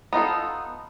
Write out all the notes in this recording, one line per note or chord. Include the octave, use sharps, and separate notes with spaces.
B3 D#4 F4 A4